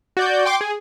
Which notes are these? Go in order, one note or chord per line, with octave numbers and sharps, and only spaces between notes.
F#4 D5 G6
G5 C6 D6
G#4